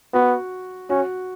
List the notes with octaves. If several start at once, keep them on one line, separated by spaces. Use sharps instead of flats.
B3 F#4
C#4 F#4